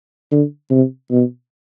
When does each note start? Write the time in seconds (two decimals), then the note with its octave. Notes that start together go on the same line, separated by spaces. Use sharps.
0.31 D3
0.71 C3
1.11 B2